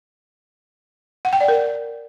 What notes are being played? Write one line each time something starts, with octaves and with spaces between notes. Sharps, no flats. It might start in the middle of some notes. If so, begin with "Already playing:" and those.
F#5
G5
D5
A#4